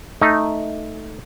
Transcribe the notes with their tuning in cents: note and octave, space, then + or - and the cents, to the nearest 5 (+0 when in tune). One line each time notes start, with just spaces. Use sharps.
A3 +0 D#4 +0